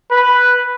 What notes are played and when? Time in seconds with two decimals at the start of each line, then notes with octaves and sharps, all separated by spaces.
0.11 B4